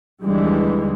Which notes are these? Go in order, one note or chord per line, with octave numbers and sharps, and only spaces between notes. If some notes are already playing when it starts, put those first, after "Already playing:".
D#2 D3 E3 G3 G#3